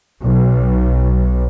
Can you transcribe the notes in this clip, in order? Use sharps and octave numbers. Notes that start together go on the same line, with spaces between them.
B1